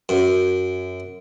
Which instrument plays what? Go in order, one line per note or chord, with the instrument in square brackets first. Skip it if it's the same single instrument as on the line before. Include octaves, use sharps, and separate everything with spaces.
[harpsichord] F#2